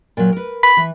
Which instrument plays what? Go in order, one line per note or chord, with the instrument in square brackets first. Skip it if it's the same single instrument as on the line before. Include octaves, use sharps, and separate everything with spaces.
[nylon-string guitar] A#2 F#3
A#4 B4
[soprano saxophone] B5
[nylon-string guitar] E3